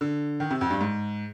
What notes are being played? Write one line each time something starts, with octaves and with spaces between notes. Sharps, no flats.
D3
D#3
C3
F2
G2
G#2